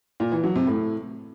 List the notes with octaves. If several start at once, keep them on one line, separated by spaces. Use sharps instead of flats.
A#2
E3
F#3
C3
A2